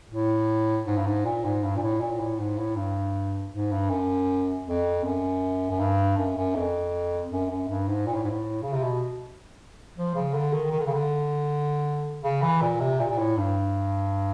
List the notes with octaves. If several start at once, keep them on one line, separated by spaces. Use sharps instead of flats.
A2
G#2
G2
G#2
A#2
G#2
G2
A#2
A2
A#2
A2
G#2
A2
G2
G#2
G2
F#2
F2
F#2
F#2
G2
F#2
F#2
F2
F#2
F#2
G2
G#2
A#2
A2
G#2
A2
C#3
C3
B2
F3
C#3
D3
D#3
D#3
D3
C#3
D3
C#3
E3
A#2
C3
A#2
A#2
A2
G2